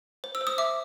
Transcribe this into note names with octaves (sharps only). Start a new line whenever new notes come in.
C5
E6
C5
D#6
E5 D6